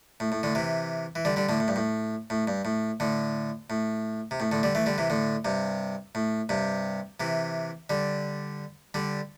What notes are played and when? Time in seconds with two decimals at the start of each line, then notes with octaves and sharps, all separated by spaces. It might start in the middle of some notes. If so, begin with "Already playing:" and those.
0.20 A2
0.32 A2
0.43 A2 D3
0.55 C3 E3
1.15 E3
1.25 D3 G3
1.36 D3 G3
1.49 A2 D3
1.60 A2
1.68 G2
1.76 A2
2.30 A2
2.47 G2
2.65 A2
3.00 A2 D3
3.70 A2
4.31 C3
4.40 A2
4.51 A2 D3
4.63 D3 G3
4.75 E3 A3
4.86 D3 G3
4.98 C3 E3
5.10 A2 D3
5.45 G2 C3
6.15 A2
6.49 G2 C3
7.20 C3 E3
7.90 D3 G3
8.94 D3 G3